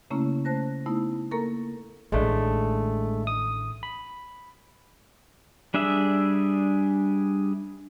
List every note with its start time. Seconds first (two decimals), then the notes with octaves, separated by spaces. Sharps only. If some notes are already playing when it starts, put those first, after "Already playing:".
0.11 C#3 A3 A#3 C#4 E4
0.45 A3 C5 A5 F#6 A#6
0.86 A3 B3 D#4 E4
1.31 A#3 A4 A#4 A#5 C#6
2.12 A1 D#3 G#3 A3 D4
3.27 D#6
3.83 B5
5.74 G3 D4 G#4 E5